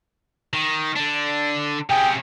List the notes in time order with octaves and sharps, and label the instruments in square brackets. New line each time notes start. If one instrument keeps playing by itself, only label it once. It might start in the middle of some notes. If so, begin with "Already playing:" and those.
[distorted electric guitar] D#3
D3 D4
[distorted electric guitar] C3 C#4 [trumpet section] G#4 G5